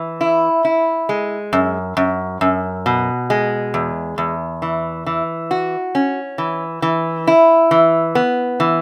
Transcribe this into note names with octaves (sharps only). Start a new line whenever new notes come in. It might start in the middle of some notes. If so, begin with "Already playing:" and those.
Already playing: E3
E4
E4
G#3
F#2
F#2
F#2
B2
G#3
E2
E2
E3
E3
F#4
C#4
E3
E3
E4
E3
B3
E3